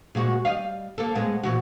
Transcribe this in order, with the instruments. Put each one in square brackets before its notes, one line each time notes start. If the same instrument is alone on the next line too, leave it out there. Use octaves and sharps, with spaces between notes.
[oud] A#2 G#3 F#4
G3 D#5 F5
A#3 A4
A2 G#3 B3
A#2 E3 F#4